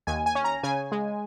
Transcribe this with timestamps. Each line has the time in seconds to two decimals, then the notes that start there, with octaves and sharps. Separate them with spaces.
0.07 D#2 G#5
0.26 G#5
0.35 C#4
0.44 A#5
0.63 C#3 G#5
0.92 G#3